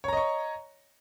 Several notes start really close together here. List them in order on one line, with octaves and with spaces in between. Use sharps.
C#5 A#5 D#5 C#6